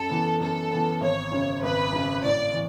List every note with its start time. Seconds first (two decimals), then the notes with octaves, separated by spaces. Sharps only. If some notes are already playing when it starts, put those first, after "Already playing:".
Already playing: F#2 A4
0.10 E3 B3
0.40 F#2 A4
0.71 E3 B3
1.01 G#1 C#5
1.32 F#2 C#3
1.62 G#1 B4
1.92 F#2 C#3
2.23 A2 D5
2.54 E3